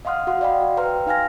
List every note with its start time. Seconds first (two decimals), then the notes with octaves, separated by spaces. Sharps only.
0.05 D#5 F5 F#5 C6 D#6 F6
0.27 F#4 F5 F#5 C6
0.41 D5 D#5 F5 G5 B5 C6
0.61 F#4
0.77 B4 C5 G5 A#5 C6 F6
1.07 D#4 F5 G#5 F6 A#6